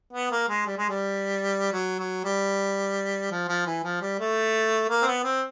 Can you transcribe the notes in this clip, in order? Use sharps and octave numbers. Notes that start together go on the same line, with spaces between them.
B3
A#3
G#3
G3
G#3
G3
F#3
F#3
G3
F3
F3
E3
F3
G3
A3
A#3
C4
B3
C4